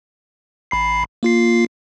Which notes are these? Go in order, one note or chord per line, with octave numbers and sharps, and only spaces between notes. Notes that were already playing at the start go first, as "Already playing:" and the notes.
A1 B5 C7
A#3 F4 C7